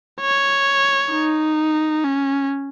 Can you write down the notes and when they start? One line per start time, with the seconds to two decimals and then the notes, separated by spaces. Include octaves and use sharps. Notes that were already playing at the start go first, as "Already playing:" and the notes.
0.21 C#5
1.12 D#4
2.04 C#4